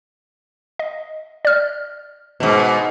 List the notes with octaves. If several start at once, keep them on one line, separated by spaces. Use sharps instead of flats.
D#5
D5 F6
G#2 B2